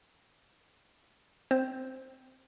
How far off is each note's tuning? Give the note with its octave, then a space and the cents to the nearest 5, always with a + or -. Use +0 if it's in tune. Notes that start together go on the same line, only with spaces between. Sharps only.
C4 -10 C5 +0